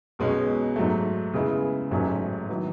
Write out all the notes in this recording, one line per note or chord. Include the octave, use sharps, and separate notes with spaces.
B1 B2 G#3 C#4
G#2 F#3 A3
C#3 G#3 B3 E4
A1 G#2 F#3 A3 C#4
D#3 F#3 B3 E4